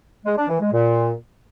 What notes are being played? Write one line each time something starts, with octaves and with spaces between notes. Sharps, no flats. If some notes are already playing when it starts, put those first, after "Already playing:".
G#3
D4
E3
G#3
A#2